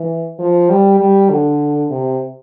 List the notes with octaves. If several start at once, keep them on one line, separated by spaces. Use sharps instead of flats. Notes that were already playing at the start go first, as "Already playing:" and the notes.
Already playing: E3
F3
G3
G3
D3
C3